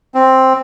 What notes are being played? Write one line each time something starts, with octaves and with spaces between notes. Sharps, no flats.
C4